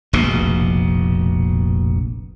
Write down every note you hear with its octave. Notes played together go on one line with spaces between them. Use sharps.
F1 A#1 B2